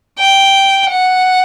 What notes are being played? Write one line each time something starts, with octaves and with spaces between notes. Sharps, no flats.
G5
F#5